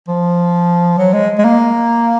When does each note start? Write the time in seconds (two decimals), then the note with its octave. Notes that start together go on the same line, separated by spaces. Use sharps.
0.08 F3
0.98 F#3
1.13 G#3
1.38 G#3
1.44 A#3